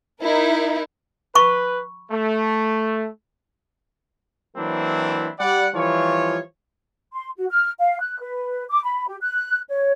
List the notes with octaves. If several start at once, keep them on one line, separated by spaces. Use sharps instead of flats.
D#4 E4 A#4
B4 B5 C#6
A3
E3 F#3 A#3 C4 D4 E4
G3 D5 F#5
E3 F3 G3 F4 C#5
C6
F#4
F6
F5
F#6
B4
D6
B5
G4
F#6
C#5